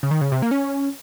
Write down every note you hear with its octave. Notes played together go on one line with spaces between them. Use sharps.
C#3
D#3
C#3
C3
A#3
C#4